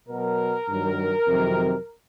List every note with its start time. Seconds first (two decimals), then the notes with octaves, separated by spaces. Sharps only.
0.08 B2 F#3 A#4
0.68 G2 D#3 F#3
1.26 F2 C3 D#3 F#3